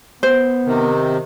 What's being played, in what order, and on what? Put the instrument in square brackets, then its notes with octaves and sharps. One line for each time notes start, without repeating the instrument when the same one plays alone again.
[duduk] B3 [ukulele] C5
[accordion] C3 D#3